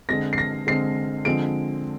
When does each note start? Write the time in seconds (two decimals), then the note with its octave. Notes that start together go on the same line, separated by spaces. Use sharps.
0.09 D3 G#3 C4 A#6
0.33 C7
0.38 A#6
0.67 D3 G#3 C4 C7
1.25 D3 F3 G#3 C4 D7